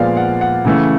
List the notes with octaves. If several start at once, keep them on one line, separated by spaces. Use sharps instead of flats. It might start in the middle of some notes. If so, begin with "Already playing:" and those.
Already playing: A#2 F3 G#3 B3 D5 F5
F#5
F#5
C#3 E3 A3